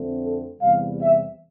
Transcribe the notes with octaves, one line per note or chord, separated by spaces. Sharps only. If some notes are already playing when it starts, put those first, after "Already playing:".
Already playing: F2 D3 A3 C4
A4
E2 C3 G3 F5
E5